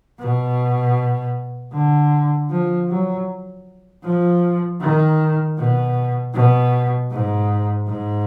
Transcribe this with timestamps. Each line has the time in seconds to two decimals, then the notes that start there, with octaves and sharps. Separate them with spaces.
0.20 B2
1.73 D3
2.50 F3
2.89 F#3
4.04 F3
4.81 D#3
5.58 B2
6.34 B2
7.11 G#2
7.88 G#2